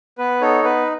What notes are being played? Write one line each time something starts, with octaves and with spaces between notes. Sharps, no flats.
B3 B4
D#4 A4 C#5
B3 B4